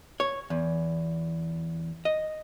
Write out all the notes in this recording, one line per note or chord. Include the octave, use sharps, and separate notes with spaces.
C#5
E2
D#5